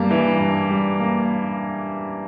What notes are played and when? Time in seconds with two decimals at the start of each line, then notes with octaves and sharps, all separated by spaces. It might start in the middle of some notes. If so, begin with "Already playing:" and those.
Already playing: G2 G3 A#3
0.11 E3
0.40 G2
0.70 G3
1.00 A#3